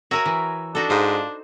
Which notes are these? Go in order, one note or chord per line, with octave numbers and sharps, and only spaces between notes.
F#4 A#4 C#5 E5 G#5 A#5
E3
D4 D#4 F#4 A4
G#2 F4 C5